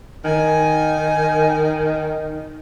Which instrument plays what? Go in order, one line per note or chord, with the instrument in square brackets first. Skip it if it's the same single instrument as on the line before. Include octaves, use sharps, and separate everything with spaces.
[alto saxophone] D#3 [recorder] G#5